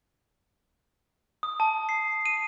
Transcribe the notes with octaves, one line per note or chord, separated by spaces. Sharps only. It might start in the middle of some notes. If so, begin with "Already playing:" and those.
D#6
A5
C7
D#7